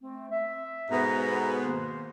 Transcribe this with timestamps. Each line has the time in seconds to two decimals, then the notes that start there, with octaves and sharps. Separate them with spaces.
0.01 A3 C4
0.31 E5
0.90 G#2 B2 B3 A4 A#5
1.61 D#3 A#3 C5